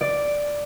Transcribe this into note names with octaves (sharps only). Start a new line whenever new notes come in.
D5